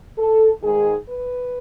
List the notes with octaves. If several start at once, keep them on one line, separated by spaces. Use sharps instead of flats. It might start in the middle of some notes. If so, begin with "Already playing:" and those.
A4
G#2 D#3 G#3 G#4
B4